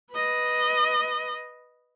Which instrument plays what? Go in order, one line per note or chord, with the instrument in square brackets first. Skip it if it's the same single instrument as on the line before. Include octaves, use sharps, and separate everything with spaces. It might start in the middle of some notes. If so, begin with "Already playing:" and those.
[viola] B4 D#5